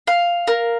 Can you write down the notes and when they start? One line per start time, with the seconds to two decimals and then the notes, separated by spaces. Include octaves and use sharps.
0.07 F5
0.47 A#4